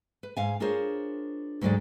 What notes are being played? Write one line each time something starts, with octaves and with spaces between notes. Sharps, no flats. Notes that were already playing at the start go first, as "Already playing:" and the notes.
B4
G#2 F5 G#5
D4 F4 G#4 A#4 C5 C#5
D2 G#2 F#3 G#3 C5 D5